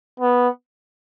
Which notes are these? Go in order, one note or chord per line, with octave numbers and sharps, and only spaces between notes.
B3